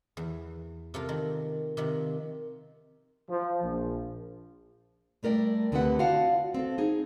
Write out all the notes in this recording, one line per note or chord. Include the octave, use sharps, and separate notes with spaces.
E2
C3 F4 A4 A#4
D#3
C3 D#3 F3
F3
A#1
G3 A3 A#4 D5 G5
D2 D3 C4 G4 B4 F#5
F4 F#4 D5 F5 F#5 A5
C4 A4
D#4 G#4